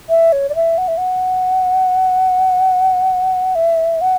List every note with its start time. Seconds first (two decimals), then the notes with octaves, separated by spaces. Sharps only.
0.09 E5
0.32 C#5
0.49 D5
0.55 E5
0.78 F#5
0.88 E5
0.98 F#5
3.55 E5
4.01 F#5